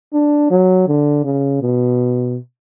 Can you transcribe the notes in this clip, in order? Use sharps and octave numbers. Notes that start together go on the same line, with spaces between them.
D4
F#3
D3
C#3
B2